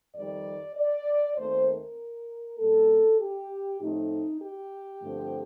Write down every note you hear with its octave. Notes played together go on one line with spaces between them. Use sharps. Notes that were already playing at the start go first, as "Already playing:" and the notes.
F2 D#3 G3 D5
D5
D#2 D#3 A3 C4 C5
A#4
A#2 G3 A#3 A4
G4
A2 F3 A3 C4 D#4
G4
G2 D3 F3 A3 C4